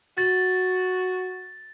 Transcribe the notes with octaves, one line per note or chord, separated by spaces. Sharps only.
F#4 A6